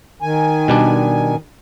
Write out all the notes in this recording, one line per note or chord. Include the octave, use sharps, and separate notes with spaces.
D#3 G#5
B2 G3 D4